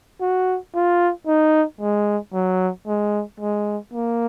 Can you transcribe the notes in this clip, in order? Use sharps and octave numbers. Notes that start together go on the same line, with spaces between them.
F#4
F4
D#4
G#3
F#3
G#3
G#3
A#3